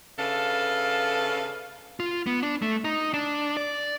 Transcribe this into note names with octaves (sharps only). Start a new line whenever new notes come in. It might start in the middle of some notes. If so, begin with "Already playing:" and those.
C#3 D4 A4 B4 E5 F5
F4
B3
D4
A3
D#4
D4
D5